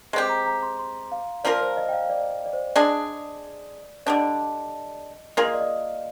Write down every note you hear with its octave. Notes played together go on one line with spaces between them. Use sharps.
G#3 C4 G4 C6
A#5
A#5
C6
C6
F5
F3 A#3 F4 A#4 D5
C5
D#5
G5
F5
D5
D5
C5
G#3 D4 G#4 D5
D3 G3 D4 D#5
A#3 F4 G#4 F5
D#5
D5
D#5